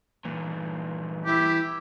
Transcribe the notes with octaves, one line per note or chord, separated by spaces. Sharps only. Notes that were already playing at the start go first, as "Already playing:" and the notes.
G2 A#2 E3
E4 G4